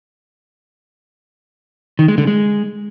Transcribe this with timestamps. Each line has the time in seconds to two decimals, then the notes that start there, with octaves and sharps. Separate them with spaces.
1.99 D#3
2.08 G#3
2.18 D3
2.27 G#3